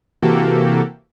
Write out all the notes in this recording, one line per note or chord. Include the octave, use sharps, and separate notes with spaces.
C3 E3 A#3 F#4 G4 A4